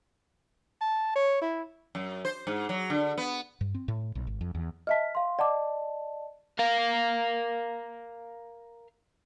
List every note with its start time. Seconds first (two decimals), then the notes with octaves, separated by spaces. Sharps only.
0.81 A5
1.15 C#5
1.42 E4
1.95 F#2
2.25 C5
2.47 G#2
2.69 F#3
2.90 D3
3.18 B3
3.61 G2
3.75 C4
3.88 A2
4.15 B1
4.27 G#1
4.41 F2
4.55 E2
4.87 D#5 E5 A5 F6 B6
5.15 F5 C6
5.39 D5 D#5 F#5 A5 D6
6.59 A#4 F5